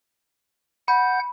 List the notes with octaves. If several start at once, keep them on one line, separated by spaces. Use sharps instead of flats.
F#5 B5 G6